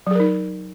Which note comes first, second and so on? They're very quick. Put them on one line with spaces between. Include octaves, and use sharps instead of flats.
F#3 G#4 A#4 D#4